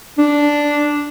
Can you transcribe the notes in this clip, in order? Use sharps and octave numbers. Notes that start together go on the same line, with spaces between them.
D4